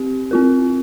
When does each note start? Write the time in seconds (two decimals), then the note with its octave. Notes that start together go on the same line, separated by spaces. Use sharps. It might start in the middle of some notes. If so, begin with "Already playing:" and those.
Already playing: C4 G4
0.31 C4 F4 A#4